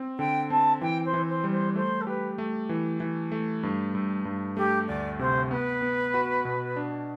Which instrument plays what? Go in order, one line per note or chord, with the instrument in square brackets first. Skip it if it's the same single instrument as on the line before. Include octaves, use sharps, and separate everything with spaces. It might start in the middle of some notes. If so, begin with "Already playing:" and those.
Already playing: [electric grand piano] C4
[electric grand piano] D3 [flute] G5
[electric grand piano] C4 [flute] A5
[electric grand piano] E3 [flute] G5
[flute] C5
[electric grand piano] E3
[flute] C5
[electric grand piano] G3
[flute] C5
[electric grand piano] A3 [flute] C5
[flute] A4
[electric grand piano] G4 [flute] B4
[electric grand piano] A3
E3
E3
A3
G2
G2
G2
[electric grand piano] A3 [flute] G4
[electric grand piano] D2 [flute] D5
[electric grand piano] C3 [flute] C5
[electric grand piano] B3 [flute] B4
[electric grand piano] B3
F#4
B2
D4